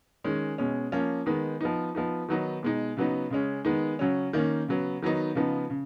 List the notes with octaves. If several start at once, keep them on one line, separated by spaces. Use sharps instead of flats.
D#3 G#3 C#4
B2 G#3 C#4
F3 A#3 C#4
D#3 G#3 B3 D#4
F3 B3 D#4
F3 B3 D#4
D#3 F#3 B3 D#4
B2 G#3 D#4
C#3 F#3 B3 D#4
C#3 G#3 C#4
D#3 G#3 B3 D#4
C#3 F#3 C#4
D#3 A#3 C#4
C#3 F#3 B3
D#3 F#3 B3 D#4
C#3 F3 B3 D#4
C#3